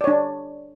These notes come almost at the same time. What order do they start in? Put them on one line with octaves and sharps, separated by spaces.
D5 C#5 D4